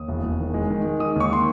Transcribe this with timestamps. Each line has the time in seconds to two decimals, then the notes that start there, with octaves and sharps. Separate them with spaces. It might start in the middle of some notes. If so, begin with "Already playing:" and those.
Already playing: D#2 D#6
0.08 E1
0.23 E1
0.39 D#3
0.54 G#3
0.70 D#3
0.85 G#3
1.00 G#3 D#6
1.16 D#2 C#6
1.31 D#3 C6